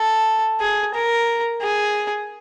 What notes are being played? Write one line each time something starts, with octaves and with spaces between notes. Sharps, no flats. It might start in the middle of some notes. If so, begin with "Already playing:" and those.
Already playing: A4
G#4
A#4
G#4